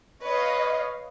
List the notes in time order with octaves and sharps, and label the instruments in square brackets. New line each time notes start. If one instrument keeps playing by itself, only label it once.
[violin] B4 [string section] C#5 D#5 F5